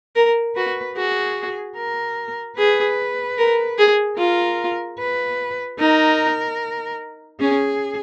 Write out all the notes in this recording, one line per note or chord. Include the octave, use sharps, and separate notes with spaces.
A#4
F#4 B4
F#4 G#4
A#4
G#4 B4
A#4
G#4
F4 A#4
B4
D#4 A#4
C#4 G#4